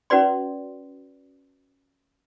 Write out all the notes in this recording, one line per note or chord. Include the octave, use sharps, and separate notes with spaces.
C#4 F#4 B4 D5 C6